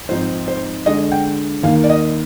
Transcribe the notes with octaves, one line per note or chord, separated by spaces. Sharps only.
G#2 F3 C4 D#4 C5
C5
D3 G#3 D4 D#5
G5
D#2 D#3 A#3 F5
D5
D#5